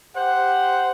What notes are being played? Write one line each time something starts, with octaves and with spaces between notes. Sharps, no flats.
G4 C5 F#5